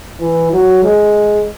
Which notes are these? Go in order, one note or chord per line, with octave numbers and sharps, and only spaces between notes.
E3
F#3
G#3